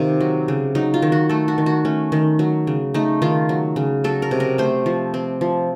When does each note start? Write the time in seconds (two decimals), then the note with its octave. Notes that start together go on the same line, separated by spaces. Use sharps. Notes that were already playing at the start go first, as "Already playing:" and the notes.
Already playing: C3 D#3 F4
0.21 F#3
0.48 C#3
0.75 F#3 D#4
0.94 F4
1.02 D#3
1.12 F#4
1.29 A3 A4
1.48 F#4
1.58 D#3
1.66 F#4
1.85 A3 C#4
2.12 D#3
2.39 F#3
2.67 C#3
2.94 A3 D#4
3.22 D#3 F4
3.49 F#3
3.76 C#3
4.04 F#3 A4
4.22 A#4
4.31 C3
4.40 A#4
4.58 A3 C5
4.86 F3
5.14 C4
5.41 F3